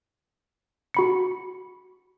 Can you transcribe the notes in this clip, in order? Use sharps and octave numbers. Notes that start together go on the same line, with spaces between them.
F#4 B5 C#7